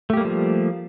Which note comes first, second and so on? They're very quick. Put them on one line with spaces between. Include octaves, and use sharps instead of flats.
A3 G4 A#3 G3 F3